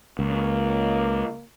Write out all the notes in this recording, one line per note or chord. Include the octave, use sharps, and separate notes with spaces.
C#2 A#3